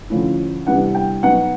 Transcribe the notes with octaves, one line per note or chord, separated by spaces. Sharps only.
D3 F3 A3 C#4 E4
C3 E3 G3 B3 D4 F#5
G5
B2 F#3 B3 D#4 F#5